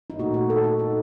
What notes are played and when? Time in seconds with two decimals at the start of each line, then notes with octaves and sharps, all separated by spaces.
0.10 D#4
0.19 A#2 A3 F#4
0.34 F#4
0.50 A4
0.64 A4
0.79 D#4